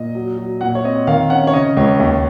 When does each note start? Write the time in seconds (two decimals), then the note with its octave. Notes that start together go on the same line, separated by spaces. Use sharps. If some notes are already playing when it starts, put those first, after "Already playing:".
Already playing: A#2 D#5
0.15 F#3
0.38 F#3
0.61 A#2 F#5
0.75 C#5
0.84 C4 D#5
1.07 D#3 F5
1.30 C#4 F#5
1.47 C#5
1.54 C#3 D#5
1.77 C#2 C#5
2.00 D#2